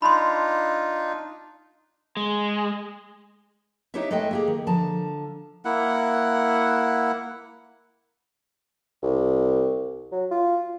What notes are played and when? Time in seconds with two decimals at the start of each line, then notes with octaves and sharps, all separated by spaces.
0.02 D4 D#4 F4 B5 C6
2.17 G#3
3.94 D#4 E4 G4 B4 C#5 E5
4.11 G#3 A3 A4 D#5 E5 G5
4.31 A#3 G4 G#4
4.47 D#3
4.67 D3 F3 A5 A#5
5.65 A#3 E4 F#5
9.03 C2
10.12 F#3
10.31 F4